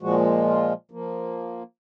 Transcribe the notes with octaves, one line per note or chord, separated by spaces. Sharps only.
A#2 F3 G#3 F#4
F4
F3 A#3